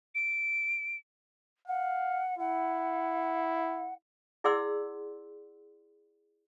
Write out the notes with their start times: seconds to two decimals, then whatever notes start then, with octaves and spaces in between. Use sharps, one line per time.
0.15 D7
1.68 F5 F#5
2.39 E4 F#5
4.44 E4 G#4 D5 F#5 C6 E6